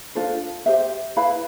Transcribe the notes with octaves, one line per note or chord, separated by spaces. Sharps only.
D4 F4 A4 C5
G4 C5 E5
E4 B4 F5 B5